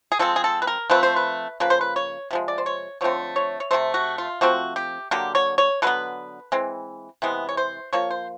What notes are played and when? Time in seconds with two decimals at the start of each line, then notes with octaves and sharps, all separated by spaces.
0.12 G#4
0.19 F3 G#3 C4 A4
0.36 G#4
0.44 A4
0.62 B4
0.67 A#4
0.90 F3 A3 C4 B4
1.03 C5
1.16 B4
1.60 C#3 F3 A#3 B4
1.70 C5
1.81 B4
1.96 C#5
2.31 C3 F3 G#3
2.48 D5
2.58 C5
2.66 C#5
3.01 D3 F3 A3 C4 C#5
3.36 C#5
3.60 C#5
3.71 C3 F3 A3 C5
3.94 F#4
4.18 F4
4.41 F3 A3 C4 F#4
4.76 G4
5.11 D3 F#3 A#3 G4
5.35 C#5
5.58 C#5
5.82 D3 F#3 B3 B4
6.52 E3 G#3 C4
7.22 C3 E3 G#3 B3
7.49 C#5
7.57 C5
7.93 F3 A#3 C#5
8.11 C5